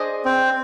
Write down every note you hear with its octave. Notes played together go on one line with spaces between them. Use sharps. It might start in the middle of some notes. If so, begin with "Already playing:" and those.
Already playing: D4 G#4 C5 D#5
C4